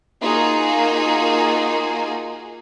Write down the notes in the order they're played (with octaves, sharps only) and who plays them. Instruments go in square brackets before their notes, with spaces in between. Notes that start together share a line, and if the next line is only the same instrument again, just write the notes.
[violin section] A#3 D#4 F4 F#4 G#4